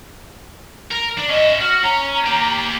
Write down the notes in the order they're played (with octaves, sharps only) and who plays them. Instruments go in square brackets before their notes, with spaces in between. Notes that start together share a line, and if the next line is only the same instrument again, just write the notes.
[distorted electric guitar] A#4
D4
[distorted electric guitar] C#4 E5 [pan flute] D#5
[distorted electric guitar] F#4 [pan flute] F6
[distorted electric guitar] C#4 [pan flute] A#5
[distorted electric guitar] A#3 G4